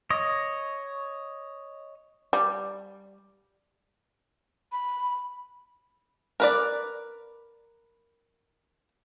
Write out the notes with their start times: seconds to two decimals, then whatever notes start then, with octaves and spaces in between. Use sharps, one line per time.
0.10 C#5 D#5
2.33 G3
4.72 B5
6.40 A#4 B4 D5